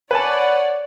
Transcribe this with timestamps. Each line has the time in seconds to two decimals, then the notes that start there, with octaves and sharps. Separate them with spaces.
0.11 B4 C#5 D5 F#5 G#5 A5